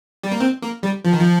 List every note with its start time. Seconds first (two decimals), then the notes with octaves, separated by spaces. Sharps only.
0.23 G3
0.31 A#3
0.40 C4
0.62 A#3
0.83 G3
1.05 F3
1.13 D#3
1.20 F3